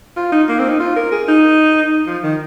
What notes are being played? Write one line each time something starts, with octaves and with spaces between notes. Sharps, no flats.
F4
D#4
A#3
C4
D#4
F4
A#4
G#4
D#4
F3
D#3